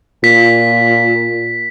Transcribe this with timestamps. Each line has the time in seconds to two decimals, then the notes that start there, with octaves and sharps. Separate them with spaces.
0.24 A#2 F4 B6